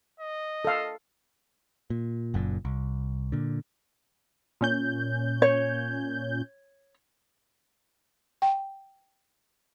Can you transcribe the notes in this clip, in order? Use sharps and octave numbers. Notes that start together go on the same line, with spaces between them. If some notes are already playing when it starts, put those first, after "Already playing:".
D#5
A4 F5
A#2
F#1 F#2 A#2
C2
A#2 D3
A#2 C#4 G6
C#5
G5